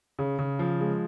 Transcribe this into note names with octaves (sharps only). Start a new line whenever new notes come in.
C#3
C#3
F3
G#3